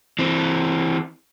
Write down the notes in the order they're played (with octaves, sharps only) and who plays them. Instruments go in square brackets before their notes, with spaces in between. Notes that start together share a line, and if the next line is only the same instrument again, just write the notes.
[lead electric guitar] E3 C4